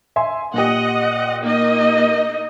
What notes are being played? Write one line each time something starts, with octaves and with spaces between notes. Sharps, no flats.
E5 G#5 C6
A#2 G4 D#5 F#5
A#3 D#4 D#5